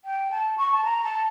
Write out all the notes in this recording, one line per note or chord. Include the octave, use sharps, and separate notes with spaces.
G5
A5
C#6
A5
A#5
A5